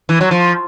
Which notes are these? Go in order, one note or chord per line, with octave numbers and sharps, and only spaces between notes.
E3
F#3
F3